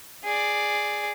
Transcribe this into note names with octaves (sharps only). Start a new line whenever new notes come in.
G#4 D5